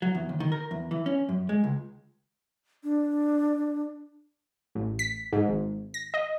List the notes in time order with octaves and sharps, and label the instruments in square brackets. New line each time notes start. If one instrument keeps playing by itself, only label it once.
[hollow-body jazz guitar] F#3
E2
D#2
D#3
A#4
E2
E3
C#4
F#2
G#3
C#2
[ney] D4
[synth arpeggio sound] A1
B6
G#2
G#1
A#6
D#5